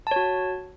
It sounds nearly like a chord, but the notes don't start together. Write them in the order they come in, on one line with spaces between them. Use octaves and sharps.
A5 C#5 F#4